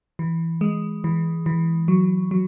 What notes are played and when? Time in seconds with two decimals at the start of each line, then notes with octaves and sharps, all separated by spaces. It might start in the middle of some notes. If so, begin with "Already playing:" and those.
0.19 E3
0.61 G#3
1.04 E3
1.46 E3
1.88 F#3
2.31 F#3